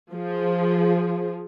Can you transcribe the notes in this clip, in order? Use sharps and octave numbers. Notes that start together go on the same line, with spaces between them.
F3 G#4